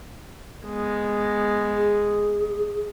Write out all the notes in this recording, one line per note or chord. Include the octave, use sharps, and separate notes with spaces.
G#3 B3
G#4